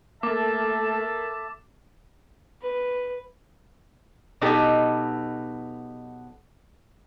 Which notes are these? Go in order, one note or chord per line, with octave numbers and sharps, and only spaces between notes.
A3 A#3 A4 E5 A5 D6
B4
B2 F#3 B3 D#4 G4 A4